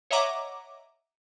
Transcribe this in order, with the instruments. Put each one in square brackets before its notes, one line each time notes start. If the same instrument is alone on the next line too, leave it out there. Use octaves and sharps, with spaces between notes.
[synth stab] C#5 D#5 E5 F#5 A#5 D6